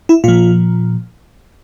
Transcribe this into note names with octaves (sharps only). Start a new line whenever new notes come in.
E4
A#2 F3 F4